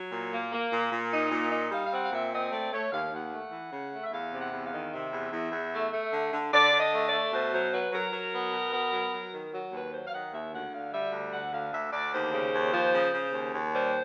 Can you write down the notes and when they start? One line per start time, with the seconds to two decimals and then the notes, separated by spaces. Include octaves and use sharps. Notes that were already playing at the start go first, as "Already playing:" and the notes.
Already playing: F#3
0.12 A#2
0.32 A#3
0.51 A#3
0.72 A#2
0.91 A#2
1.12 D#4
1.32 A#2
1.51 D#4
1.71 G3 F5
1.86 F5
1.92 C4 F#5
2.02 F5
2.11 A#2 E5
2.32 C4 D#5
2.52 A3 D5
2.72 A3 C#5
2.92 D#2 F5
3.12 D#2 F#5
3.32 A3
3.52 E3
3.72 C#3
3.92 A3
4.03 E5
4.12 E2 F5
4.33 C3
4.39 F#5
4.52 E2
4.65 F5
4.71 D#3
4.92 C3 E5
5.11 E2
5.32 E2
5.52 E2
5.73 A3
5.92 A3
6.12 D3
6.32 D3
6.52 D3 D5
6.72 D3
6.79 D#5
6.93 A3
7.06 D5
7.12 A3
7.32 B2 C5
7.52 F#3 C5
7.72 F#3 B4
7.92 F#3 A#4
8.12 F#3
8.32 B3
8.52 B2
8.72 B3
8.92 F#3
9.12 F#3
9.33 D#3
9.53 F#3
9.72 D#2 B4
9.92 F#3 C5
10.06 F5
10.12 D#3 F#5
10.33 D#2 E5
10.52 D2 F#5
10.72 D3 F5
10.92 G3 E5
11.12 D2
11.32 D3 F#5
11.52 D2 F5
11.72 D2 E5
11.92 D2 D5
12.12 D#2 C5
12.32 C#3
12.53 D#2
12.73 F3
12.93 C#3
13.13 C#3
13.33 D#2
13.53 D#2
13.72 G3 C5